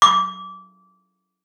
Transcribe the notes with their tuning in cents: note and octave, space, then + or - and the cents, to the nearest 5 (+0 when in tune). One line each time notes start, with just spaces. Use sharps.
D6 -25